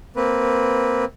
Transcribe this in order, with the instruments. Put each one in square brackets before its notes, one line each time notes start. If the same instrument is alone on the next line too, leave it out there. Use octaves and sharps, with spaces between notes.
[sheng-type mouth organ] A#3 C4 B4